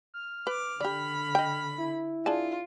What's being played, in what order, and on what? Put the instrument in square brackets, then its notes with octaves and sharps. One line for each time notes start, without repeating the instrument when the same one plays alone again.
[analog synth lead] F6
[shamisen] B4 [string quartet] D6
[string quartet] D3 B5 [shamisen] G4 D5
[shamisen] D#5 G5
[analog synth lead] E4
[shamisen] D4 G#4 A5 [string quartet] F4